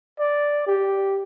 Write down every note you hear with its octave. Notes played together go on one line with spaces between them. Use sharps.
D5
G4